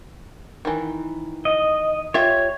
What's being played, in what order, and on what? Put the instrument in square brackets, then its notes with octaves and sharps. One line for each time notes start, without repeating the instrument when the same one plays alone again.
[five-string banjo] D#3 E3
[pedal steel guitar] D#5
[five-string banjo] F4 G4 E5 [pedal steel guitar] C#5